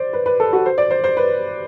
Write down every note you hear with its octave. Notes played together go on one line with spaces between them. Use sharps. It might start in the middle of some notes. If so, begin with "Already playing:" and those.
Already playing: C5 D5
B4
B4
A4
F#4
C5
D5
C5
C5
B4